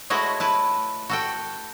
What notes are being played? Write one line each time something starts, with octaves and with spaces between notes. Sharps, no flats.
G#3 A3 E4 F#4 C#5 D#5
E4 B4 A5
F#4 A4 G5